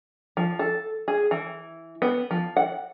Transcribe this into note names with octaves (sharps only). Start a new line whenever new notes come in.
F3
A4
G#4
E3
B3
F3
F#5